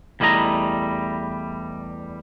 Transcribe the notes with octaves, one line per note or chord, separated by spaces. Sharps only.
E2 G3 A3 E4 D#5 A#5